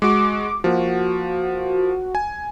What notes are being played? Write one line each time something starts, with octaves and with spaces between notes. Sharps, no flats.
G#3 F#4 D6
F3 A#3 F#4
G#5